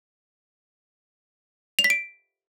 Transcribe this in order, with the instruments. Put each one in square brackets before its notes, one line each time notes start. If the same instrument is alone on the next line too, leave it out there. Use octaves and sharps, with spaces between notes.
[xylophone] F7
B6
D7